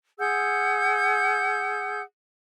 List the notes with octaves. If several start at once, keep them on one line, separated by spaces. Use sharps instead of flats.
G#4 F#5 E6 G6